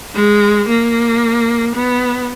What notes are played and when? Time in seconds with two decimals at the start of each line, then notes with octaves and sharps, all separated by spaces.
0.14 G#3
0.68 A#3
1.75 B3